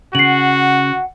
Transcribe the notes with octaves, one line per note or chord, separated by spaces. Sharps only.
C#3 F#4 F#5 C7 F#7